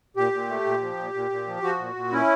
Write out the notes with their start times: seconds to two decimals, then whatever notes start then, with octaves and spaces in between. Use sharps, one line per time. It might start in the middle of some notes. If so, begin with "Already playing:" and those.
0.16 A#2 G4
0.32 A#2
0.49 A3
0.65 A#2
0.82 F3
0.98 A#2
1.14 A#2
1.31 A#2
1.47 F3
1.63 F3 F#4
1.79 A#2
1.96 A#2
2.12 C#4 E4